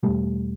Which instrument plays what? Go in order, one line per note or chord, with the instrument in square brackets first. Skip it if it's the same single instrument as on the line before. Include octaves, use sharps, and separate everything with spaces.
[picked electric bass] E2 B2 G3 A3